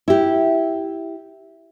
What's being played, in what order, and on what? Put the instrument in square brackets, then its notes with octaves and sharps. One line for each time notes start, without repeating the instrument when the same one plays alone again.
[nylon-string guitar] E4 G4